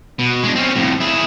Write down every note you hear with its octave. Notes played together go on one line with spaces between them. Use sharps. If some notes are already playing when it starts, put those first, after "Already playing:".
B2
G#3 D4
C4 C#4
F2 A2
E4 G#4